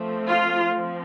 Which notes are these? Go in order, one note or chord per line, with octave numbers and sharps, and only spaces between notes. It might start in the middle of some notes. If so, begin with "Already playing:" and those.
Already playing: F3 A3 C4
F4
F3 C4